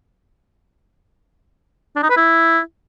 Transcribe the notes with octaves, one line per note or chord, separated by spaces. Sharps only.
D4
D#4
B4
E4